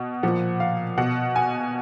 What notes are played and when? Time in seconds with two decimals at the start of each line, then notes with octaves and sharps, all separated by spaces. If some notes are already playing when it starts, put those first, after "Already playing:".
Already playing: B2
0.23 A#2 F3 F#5
0.60 F5
0.98 B2 F#5
1.36 G#5